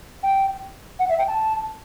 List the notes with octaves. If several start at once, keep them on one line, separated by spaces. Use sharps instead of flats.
G5
F#5
E5
G5
A5